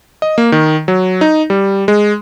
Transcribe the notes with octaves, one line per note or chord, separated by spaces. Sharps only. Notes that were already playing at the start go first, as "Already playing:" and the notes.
D#5
A#3
D#3
F#3
D#4
G3
G#3